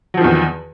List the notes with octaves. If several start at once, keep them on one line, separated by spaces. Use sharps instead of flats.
E2 D#3 F3 F#3